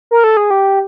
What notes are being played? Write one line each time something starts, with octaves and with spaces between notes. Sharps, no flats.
A#4
A4
G#4
G4